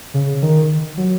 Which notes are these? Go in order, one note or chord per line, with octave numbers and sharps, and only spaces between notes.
C#3
D#3
F#3